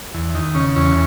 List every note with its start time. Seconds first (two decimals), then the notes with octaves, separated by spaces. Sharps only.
0.14 E2
0.35 D#3
0.54 C#3 C#4
0.76 E2 C#4